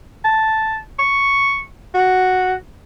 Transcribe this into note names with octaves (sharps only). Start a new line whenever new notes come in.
A5
C#6
F#4